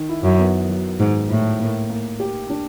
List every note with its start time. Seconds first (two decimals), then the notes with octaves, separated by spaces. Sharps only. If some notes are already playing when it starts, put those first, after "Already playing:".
Already playing: D#3
0.09 E4
0.24 F#2
0.39 B3
0.69 F#3
0.99 G#2 D#3
1.29 A2 E4
1.59 A#3
1.90 A#3
2.20 G4
2.50 D4